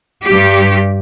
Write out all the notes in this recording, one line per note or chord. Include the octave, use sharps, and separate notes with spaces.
G2 G4